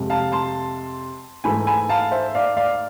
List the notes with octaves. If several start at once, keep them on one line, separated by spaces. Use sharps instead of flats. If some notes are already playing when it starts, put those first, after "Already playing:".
Already playing: F2 C3 G#3
F5 A5
A5 C6
G#2 E3 A3 G#5 B5
G#5 B5
F5 A5
C5 E5
D5 F5
D5 F5